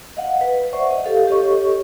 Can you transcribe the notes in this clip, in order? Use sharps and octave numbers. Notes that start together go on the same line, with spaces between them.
D#5 F5 F#5
B4
C5 D5 E5 F#5 C#6
D#5
G4 A4 F5
G4 A4 C#5 D#5 C#6